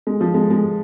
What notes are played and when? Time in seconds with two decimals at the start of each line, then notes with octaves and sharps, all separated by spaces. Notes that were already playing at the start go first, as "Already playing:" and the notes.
0.07 G#3
0.21 F3
0.34 G#3
0.50 G#3